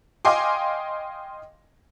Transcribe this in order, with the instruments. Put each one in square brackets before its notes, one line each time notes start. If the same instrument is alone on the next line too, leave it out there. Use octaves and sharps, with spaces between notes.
[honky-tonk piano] D#5 F5 G5 G#5 C6 D6